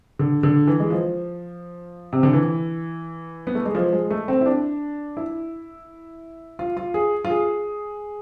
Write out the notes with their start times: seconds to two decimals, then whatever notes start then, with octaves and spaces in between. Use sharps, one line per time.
0.19 D3
0.43 D3
0.67 E3
0.80 G#3
0.90 F3
2.13 C3
2.23 D3
2.33 E3
3.47 B3
3.55 A3
3.65 G#3
3.75 F3
3.93 G#3
4.10 A3
4.28 C4
4.41 E4
4.46 D4
5.17 E4
6.59 F4
6.77 F4
6.94 G#4
7.25 F4
7.30 G#4